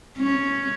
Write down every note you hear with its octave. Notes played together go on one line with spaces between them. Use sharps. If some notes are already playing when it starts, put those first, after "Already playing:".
C#4